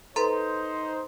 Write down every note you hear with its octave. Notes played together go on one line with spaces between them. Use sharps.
D#4 A4 B4 C5 A#5 C6